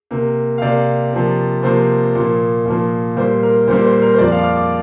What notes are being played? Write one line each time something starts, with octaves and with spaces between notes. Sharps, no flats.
C3 A#3
F5
C3 A#3 D5
C3 F3 A#3
C3 F3 A#3 C5
A#2 F3 A#3
A#2 F3 A#3
A#2 G3 A#3 C5
A#4
A#2 G3 A#3 C5
C5
A#4
C5
F2 F3 A#3 D5
F5
D6
F6
D6